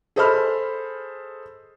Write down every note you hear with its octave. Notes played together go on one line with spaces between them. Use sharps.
G#4 A4 C5 D#5 B5 F6